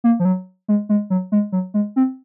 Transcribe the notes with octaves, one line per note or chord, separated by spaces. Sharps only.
A#3
F3
F#3
G#3
G#3
F#3
G#3
F#3
G#3
C4